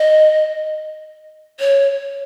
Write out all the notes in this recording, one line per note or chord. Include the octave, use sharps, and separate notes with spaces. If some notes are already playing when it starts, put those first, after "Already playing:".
Already playing: D#5
C#5